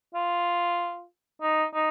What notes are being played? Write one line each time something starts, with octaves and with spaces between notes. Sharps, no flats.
F4
D#4
D#4